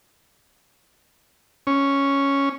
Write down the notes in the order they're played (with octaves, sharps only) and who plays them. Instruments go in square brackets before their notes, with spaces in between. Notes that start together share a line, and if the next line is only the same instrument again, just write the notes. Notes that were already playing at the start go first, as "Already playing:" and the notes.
[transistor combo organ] C#4